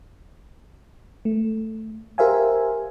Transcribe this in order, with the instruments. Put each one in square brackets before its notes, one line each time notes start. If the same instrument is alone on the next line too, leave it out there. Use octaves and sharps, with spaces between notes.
[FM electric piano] A3
G4 A#4 C5 E5 F5 G#5